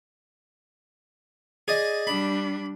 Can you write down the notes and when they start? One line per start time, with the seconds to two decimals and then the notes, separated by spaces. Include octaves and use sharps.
1.68 G#4 D5 D#5
2.07 G3 D4 B5